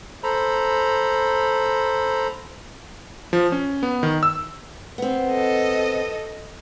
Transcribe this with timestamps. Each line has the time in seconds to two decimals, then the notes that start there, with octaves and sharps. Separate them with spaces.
0.23 A4 C5 A#5 B5
3.33 F3
3.52 C#4
3.83 B3
4.03 D#3
4.23 E6
4.98 B3 C4
5.30 A4 D#5